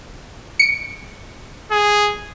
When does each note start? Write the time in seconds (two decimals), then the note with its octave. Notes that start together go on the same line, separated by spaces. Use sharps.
0.59 C#7 D7
1.71 G#4